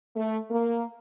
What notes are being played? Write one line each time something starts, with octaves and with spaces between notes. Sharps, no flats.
A3
A#3